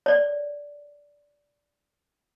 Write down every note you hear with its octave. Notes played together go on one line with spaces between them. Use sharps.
C#5 D5